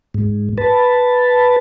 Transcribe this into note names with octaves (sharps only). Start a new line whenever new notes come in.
G#2
B4 A5